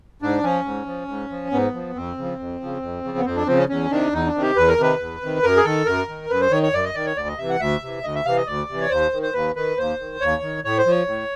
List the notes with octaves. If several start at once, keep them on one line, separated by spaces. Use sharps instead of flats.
G#2 D4
F3 C#4
G#2
F3
G#2
F3
G#2 B3
F3
F2 C4
C#3 F3
F2
C#3 F3
F2
C#3 F3
B3
F2 C4
D4
C#3 F3 C4
C#4
E2 C#4
C3 D#3 D4
E2 D#4
D4
C3 D#3
G4
E2 B4
A#4
C3 D#3 B4
E2
C3 D#3
F#2 A#4
G#4
D#3 A4
F#2 A#4
D#3
F#2 B4
C5
D#3 C#5
C#5
F#2 D5
D#5
D#3 D5
C#5
D2 D5
D#5
C3 E3 E5
F#5
D2 E5
C3 E3
D2 D#5
E5
C3 E3 F5
D#5
D2 D5
C3
E3
C#5
D#2 C5
D#3
C5
D#2 B4
D#3 B4
D#2 C5
D#3
D#2 C#5
D#3
A2 C#5
C5
F3 C#5
A2